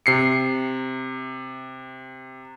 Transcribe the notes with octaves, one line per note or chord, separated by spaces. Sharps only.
C3 C7 C#7